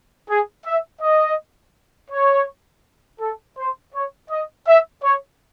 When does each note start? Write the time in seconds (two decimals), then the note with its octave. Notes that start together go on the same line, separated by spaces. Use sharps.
0.29 G#4
0.65 E5
1.01 D#5
2.11 C#5
3.20 A4
3.58 C5
3.94 C#5
4.30 D#5
4.67 E5
5.03 C#5